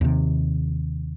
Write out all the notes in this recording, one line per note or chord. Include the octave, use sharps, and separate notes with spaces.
D#2 C3